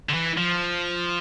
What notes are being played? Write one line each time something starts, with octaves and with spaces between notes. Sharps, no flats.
D3
E3
F3